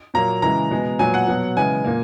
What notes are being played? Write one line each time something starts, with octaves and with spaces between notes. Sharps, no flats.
A#2 F#3 A#3 A#5
C#3 E3 G#3 A#5
B2 G#3 B3
A#2 F#3 B3 G#5
F#5
B2 F#3 B3
C#3 E3 G#3 B3 G#5
A#2 A#3